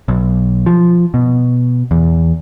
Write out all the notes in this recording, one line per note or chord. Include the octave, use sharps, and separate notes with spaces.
B1
F3
B2
E2